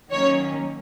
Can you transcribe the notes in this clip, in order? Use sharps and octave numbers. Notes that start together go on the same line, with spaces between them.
D#3 F#3 A#3 C#4 C#5